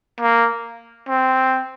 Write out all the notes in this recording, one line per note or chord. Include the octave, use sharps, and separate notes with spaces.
A#3
C4